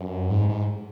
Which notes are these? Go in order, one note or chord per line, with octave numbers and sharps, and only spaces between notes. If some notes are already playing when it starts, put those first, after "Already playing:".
Already playing: F#2
G#2
G#2